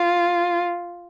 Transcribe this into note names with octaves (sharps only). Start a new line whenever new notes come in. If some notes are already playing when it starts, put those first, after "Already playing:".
Already playing: F4